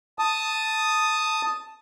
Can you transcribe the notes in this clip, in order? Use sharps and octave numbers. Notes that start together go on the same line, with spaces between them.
A5 D#6